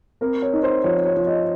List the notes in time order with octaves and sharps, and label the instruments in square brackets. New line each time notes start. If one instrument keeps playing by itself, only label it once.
[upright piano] C4 A#4
C#5
D#4
C5
F3 C#5
C#5
F3
D#5